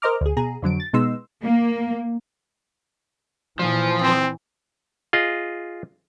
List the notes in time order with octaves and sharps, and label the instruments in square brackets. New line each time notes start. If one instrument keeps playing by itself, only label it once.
[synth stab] A#4 C5 D#5 A#5 D6 F6
D2 G#4
B2 G#4 A#5
F2 D3 F#3 D7
A6
B2 G#3 B3 D#4 C6 E6
[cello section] A#3
[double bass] A#2 E3 [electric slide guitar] F3
[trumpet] C4
[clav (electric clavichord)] F4 G#4 D#5